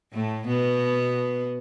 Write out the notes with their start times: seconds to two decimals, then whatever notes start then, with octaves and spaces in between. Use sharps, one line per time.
0.13 A2 A3
0.47 B2 B3